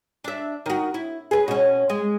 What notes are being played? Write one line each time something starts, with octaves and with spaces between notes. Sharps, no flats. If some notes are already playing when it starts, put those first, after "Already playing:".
D4 E5
D#3 F#4
E4
G#4 B4
B2 C#4
G#3